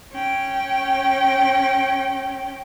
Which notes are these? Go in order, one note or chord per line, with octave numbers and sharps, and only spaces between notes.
C#4 G5